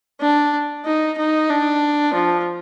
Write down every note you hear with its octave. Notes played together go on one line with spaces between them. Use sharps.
D4
D#4
D#4
D4
F3